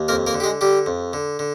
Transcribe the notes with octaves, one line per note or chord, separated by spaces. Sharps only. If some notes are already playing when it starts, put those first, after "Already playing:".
Already playing: D#2
F2 A#3 A#4
A#3 A#4
D3
G4
G#3 G#4
D3 G3 G4
F2
D3
D3